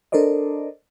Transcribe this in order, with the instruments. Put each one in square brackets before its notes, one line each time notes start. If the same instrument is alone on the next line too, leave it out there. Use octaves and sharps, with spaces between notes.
[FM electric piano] D4 A4 A#4 C5 D5 D#5